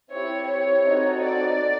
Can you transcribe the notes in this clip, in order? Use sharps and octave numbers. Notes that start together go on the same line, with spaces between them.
C4 E4 G4 C#5
C#5
C4 D#4 F#4 A4
D5